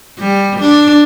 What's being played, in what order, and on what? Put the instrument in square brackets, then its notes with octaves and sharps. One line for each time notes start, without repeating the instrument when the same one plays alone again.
[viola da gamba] G3
D4